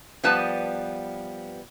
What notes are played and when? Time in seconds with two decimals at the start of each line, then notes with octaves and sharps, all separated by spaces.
0.24 F3 G3 B3 B4 A5